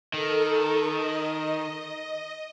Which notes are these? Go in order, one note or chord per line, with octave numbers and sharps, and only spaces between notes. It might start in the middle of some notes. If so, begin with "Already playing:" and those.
D#3 A4 A#4
D#5